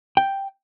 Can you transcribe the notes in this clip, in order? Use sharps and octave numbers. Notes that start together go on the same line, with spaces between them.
G5